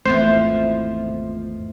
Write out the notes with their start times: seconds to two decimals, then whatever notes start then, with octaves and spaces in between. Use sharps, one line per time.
0.06 G#1 E2 F3 A3 B3 C4 E4 C5